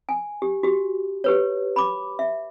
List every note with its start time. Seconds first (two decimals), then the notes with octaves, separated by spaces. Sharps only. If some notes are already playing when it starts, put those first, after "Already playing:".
0.09 G#5
0.42 G4
0.63 F#4 G4
1.24 G4 B4 C#5
1.76 B5 D6
2.19 E5